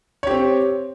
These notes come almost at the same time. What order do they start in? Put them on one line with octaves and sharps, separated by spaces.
C#5 G4 C4